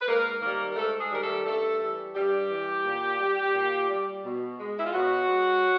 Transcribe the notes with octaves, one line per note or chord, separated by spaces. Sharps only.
B4
G#2 A#3 A#4
D#3 G3 A#3 A#4
A#4
G#2 A3 A4
G#3 G#4
D#3 G3 A#4
A3 A4
G2 A3 A4
E3 G3
G2 G3 G4
E3 G3
A#2
G3
A#2
G3
B2
G#3
E4
F4
B2 F#3 F#4
G#3